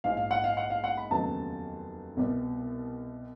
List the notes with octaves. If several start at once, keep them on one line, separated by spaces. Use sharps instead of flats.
A#1 G#2 F3 F5
F5
F#5
F5
F#5
F5
F#5
B5
F1 D#2 C#3 F#3 B3 A5
C2 B2 G3 B3